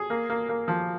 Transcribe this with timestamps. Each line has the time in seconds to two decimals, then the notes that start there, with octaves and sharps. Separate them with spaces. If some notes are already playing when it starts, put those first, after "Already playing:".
Already playing: G#4
0.10 A#3
0.30 A#3
0.49 A#3
0.68 F3